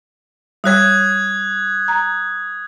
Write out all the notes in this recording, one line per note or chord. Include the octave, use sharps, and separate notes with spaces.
G3 C#5 D#6 F#6 G#6
A#5